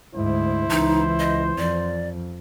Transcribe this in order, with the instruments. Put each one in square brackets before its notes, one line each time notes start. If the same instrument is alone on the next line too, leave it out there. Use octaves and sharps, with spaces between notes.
[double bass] D2 G#2 [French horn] E4 [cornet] C5
[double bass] C#2 E3 [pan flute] D#4
[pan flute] D#5
[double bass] F2 [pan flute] D5